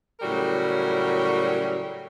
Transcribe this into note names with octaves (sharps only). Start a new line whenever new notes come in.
A2 C#3 F#3 G3 F#4 A#4